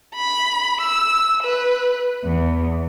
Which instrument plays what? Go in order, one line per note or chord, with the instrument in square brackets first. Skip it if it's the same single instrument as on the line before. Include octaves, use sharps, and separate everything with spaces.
[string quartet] B5
E6
B4
E2